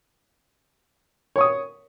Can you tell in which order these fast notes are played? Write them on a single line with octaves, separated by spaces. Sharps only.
C#5 C#6 D#6